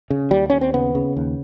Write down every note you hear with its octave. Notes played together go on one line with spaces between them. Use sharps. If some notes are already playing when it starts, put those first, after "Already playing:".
C#3
D#2 G3
D#2 C#4
C4
C#3 B3
C#3
D#2